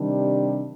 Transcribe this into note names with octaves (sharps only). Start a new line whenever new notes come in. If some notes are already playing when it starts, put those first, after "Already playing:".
Already playing: C3 D#3 G3 D4